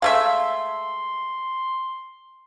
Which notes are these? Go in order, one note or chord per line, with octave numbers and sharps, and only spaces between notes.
G#3 A3 E5 F5 C6